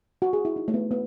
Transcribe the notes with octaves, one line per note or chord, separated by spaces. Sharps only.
F#4
G#4
E4
D#4
A3
B3
B3